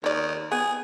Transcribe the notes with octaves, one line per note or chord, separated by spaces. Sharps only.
D#2 C#5 D5
B3 G#4